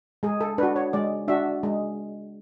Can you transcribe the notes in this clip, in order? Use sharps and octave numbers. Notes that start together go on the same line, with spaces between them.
G#3 G#4
A4
D4 F#4 B4
C#5
G#3 D5
D4 F#4 E5
G#3